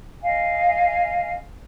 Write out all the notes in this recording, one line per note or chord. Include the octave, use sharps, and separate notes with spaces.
D#5 F5 G#5